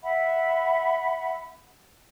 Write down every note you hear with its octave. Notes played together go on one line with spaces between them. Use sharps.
E5 F#5 B5